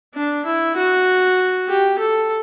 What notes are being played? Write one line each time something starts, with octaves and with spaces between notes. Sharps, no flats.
D4
E4
F#4
G4
A4